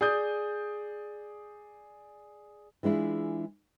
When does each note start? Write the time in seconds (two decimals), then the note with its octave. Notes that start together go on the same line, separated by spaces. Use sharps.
0.01 G#4 D5 D#6 G6
2.83 E3 G#3 D4 E4 F4